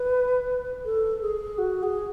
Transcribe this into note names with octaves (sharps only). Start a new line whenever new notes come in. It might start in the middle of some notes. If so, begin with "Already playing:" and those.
Already playing: B4
A4
G#4
F#4
G#4